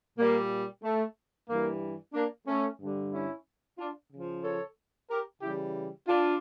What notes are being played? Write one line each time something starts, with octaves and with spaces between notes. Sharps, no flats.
A#2 G3 A#3
A3
G2 E3 G3 A#3
A#3 D4
A3 C#4
G2 D3 G3
C#4 E4
D4 F4
C#3 F3
A4 C#5
G4 A#4
C#3 E3 G3 E4 G4
D4 F4